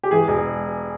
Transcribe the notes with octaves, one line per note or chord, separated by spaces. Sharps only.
G4
E3 G#4
E1